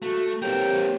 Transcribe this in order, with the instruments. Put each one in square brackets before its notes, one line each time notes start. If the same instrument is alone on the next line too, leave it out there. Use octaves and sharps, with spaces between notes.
[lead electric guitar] A3 [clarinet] F#4
[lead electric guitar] A#3 C4 [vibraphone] G4 C#5 [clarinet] G5